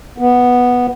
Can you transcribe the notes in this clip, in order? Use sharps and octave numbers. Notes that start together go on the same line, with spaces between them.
B3